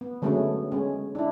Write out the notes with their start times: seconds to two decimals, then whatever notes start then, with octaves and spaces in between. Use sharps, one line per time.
0.01 B3
0.22 D3 F#3 G#3 A3 B3 C#4
0.72 G#3 C#4
1.15 D4 E4